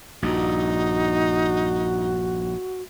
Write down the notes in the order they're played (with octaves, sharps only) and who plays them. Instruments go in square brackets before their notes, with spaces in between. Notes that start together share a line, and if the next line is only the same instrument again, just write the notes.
[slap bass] A#1 G2 [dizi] D#4 [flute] F#4